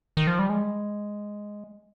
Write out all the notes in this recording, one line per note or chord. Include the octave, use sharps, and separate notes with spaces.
D#3
F3
G3
G#3